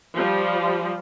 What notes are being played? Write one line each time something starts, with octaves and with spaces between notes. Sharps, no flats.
F3 G3